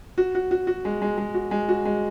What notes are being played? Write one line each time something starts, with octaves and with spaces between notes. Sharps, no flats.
F#4
F#4
F#4
F#4
G#3
G#3
G#3
F#4
G#3
F#4
G#3